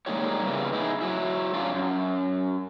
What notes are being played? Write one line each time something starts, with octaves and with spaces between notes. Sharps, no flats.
G3 G#3 A#3 D#4 G4 C#5
C#3 E3 G3 A#3 B3
D#4 E4 G#4
F#3 E4
F#3 C#4 D4 F4
F#2